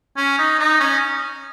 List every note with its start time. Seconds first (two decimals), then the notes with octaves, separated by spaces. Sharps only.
0.17 C#4
0.38 D#4
0.59 D#4
0.80 C#4